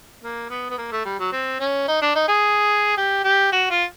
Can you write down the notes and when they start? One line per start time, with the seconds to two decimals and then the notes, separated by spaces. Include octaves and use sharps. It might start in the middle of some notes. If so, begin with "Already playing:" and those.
0.23 A#3
0.50 B3
0.70 B3
0.78 A#3
0.92 A3
1.05 G3
1.19 F#3
1.32 C4
1.60 C#4
1.88 D#4
2.01 D4
2.15 D#4
2.28 G#4
2.97 G4
3.24 G4
3.52 F#4
3.70 F4